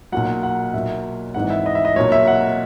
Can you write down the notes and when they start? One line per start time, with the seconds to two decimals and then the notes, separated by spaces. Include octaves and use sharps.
0.12 B1 A#2 F#3 F#5
0.43 F#5
0.74 B1 A#2 F#3 E5
1.34 G#1 G#2 E3 F#5
1.50 E5
1.66 D#5
1.75 E5
1.85 D#5
1.96 B1 A#2 F#3 C#5
2.12 E5
2.27 F#5